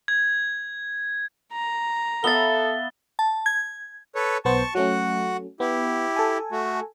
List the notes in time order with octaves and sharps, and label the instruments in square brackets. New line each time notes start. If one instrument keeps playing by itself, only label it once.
[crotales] G#6
[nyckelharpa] A#5
[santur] B3 E5 F5 [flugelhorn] A4 [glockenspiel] A6 G7
[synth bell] A5
G#6
[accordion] A4 B4 C#5
[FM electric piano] B1 B3 C5 [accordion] A5 C#6
[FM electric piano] F#3 A3 C#4 [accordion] F#4 F#5
[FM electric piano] B3 [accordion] E4 G4
[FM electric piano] A4 G#5
[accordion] A3 F#4